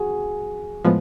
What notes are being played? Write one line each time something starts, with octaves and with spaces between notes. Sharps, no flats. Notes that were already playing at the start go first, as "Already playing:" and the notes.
Already playing: F#4 G#4
A2 F3 G#3 B3